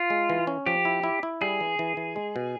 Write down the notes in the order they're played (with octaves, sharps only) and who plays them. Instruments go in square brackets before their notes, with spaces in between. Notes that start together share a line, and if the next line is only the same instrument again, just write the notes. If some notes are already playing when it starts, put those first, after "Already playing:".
Already playing: [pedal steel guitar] F4
[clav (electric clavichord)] G#3
E3
C#4
[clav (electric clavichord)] F3 [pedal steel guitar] G4
[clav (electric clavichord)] E4
E4
E4
[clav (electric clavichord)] G3 [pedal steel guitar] G#4
[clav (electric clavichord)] E3
E3
E3
G#3
B2